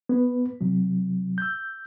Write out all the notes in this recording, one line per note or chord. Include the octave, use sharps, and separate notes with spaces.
B3 B4
C3 F#3
E6 G6